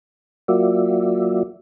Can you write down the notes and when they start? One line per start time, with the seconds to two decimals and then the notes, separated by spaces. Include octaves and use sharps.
0.48 F#3 A#3 F4 F#4 D5 E5